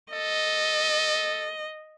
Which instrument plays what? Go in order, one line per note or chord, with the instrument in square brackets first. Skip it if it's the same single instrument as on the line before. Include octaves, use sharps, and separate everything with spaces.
[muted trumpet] A4 [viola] D#5